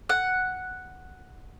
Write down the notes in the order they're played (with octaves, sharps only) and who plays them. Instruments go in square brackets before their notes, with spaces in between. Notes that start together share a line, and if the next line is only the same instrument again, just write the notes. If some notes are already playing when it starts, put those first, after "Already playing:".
[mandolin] F#5